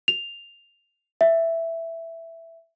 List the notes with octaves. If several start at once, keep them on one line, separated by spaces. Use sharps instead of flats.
F7
E5